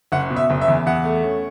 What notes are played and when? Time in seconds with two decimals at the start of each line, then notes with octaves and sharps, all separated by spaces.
0.12 F#1 F#5
0.30 B2
0.36 E5
0.50 F#1
0.61 E5
0.68 E2
0.86 E2 F#5
1.04 A3
1.23 C#4